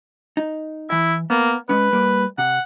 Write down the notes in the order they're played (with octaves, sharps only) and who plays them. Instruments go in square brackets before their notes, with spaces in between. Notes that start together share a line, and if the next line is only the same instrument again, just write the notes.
[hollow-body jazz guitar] D#4
[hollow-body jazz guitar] E3 E5 [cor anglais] E4
[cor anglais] A#3 [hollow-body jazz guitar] B3
[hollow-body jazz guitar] G#3 C#4 [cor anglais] B4
[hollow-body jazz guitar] G3 A#3
[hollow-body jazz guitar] C3 [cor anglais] F#5